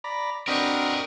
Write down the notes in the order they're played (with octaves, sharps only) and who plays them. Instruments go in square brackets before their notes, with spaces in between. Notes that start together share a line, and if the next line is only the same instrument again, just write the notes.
[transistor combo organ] D5 A#5 B5
[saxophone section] C4 D4 [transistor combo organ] F#4 D#5 F6 [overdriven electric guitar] A#4 B4